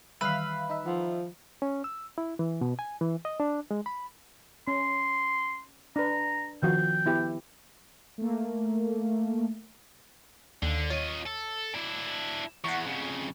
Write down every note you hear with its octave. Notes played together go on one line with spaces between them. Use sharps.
D#3 E3 G3 B4 E5 F5
D#4 E5
F3 F#5
C#4
E6
E4
E3
B2
G#5
E3
D#5
D4
G#3
B5
C#4 C6
D4 B4 A#5
D#3 F3 F#4 G5
B3 E4 G4
A3 A#3
D#2 D3
F4 C#5 D#5
A4
D4 E4
E2 F#5 C#6
F2 C#3